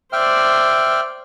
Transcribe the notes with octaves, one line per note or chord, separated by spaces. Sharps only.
C5 D5 E5 G5 F6